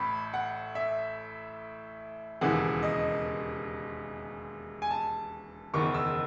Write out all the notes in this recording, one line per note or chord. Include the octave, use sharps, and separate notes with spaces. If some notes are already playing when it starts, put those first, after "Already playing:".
Already playing: A1 A2 B5
F#5
E5
E1 D#2 C#3 E3 F#5
D#5
G#5
A5
F#1 E2 D#3 C#6
E6